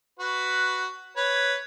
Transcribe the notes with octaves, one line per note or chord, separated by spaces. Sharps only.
F#4 B4
B4 C#5